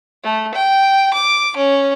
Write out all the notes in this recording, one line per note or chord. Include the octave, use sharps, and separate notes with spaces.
A3
G5
D6
C#4